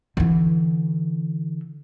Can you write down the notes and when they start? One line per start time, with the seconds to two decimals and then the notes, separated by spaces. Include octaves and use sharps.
0.17 D3 E3